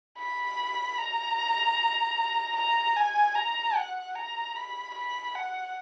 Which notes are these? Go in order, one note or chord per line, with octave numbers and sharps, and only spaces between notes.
B5
A#5
A#5
G#5
A#5
F#5
A#5
B5
B5
F#5